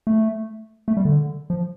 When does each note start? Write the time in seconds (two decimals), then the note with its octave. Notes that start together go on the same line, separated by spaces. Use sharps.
0.07 A3
0.88 A3
0.97 G3
1.05 D3
1.50 F3